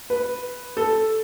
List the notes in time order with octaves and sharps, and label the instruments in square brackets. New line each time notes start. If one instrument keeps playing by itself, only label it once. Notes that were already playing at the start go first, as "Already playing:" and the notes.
[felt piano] B4
A4